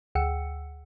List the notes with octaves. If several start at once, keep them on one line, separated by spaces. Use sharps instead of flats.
D2 G#4 F#5 G5 E6 C#7